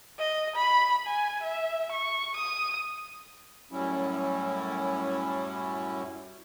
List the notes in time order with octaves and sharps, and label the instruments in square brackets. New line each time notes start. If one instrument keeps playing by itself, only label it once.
[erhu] D#5
B5
G#5
E5
C#6
D#6
[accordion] F#2 A2 F#3 G3 C#4 E4